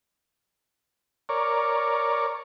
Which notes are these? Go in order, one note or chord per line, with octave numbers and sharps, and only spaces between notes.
A#4 C#5 D5